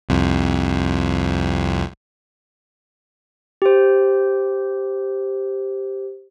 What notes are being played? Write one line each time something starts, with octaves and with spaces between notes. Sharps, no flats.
C2 F2
G4 C5